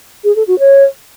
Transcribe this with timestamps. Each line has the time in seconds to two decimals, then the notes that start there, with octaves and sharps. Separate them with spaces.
0.24 G#4
0.36 A4
0.47 F#4
0.59 C#5